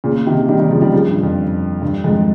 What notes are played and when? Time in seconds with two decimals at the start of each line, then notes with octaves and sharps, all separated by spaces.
0.04 A#2 C#3
0.26 C3 D#3
0.48 D#3 G3
0.60 D#3 G3
0.71 C#3 F3
0.82 D#3 G3
0.93 C#3 F3
1.08 G2
1.23 F2
1.82 G2
2.04 F2 G#2